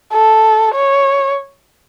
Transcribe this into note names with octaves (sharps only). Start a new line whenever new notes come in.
A4
C#5